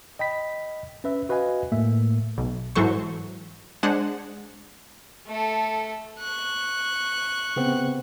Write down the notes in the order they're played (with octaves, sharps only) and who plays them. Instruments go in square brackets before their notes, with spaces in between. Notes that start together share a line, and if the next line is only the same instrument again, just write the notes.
[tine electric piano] D#5 G5 B5 B6
C#4 B4 E5
F#4 B4 D#5 F5 G#5
A2 A3 A#3 E5
[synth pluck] B1
G#2 E3 F#3 A4 C5 C#6
G#3 D4 C5 F#5
[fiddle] A3 A4
C#6 F#6
[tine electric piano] C#3 B3 C4